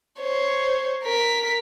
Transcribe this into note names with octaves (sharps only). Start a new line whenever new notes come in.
C5 C#5
A#4 B6